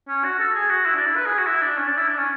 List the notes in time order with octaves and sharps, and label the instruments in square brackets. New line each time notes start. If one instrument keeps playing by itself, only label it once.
[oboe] C#4
F#4
A4
G#4
F#4
E4
D4
E4
B4
G#4
F#4
E4
D4
C#4
D4
E4
D4
C#4